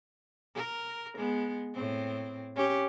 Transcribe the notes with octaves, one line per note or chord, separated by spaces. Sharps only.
A#4
G#3 B3
A2 C4
C#4 G4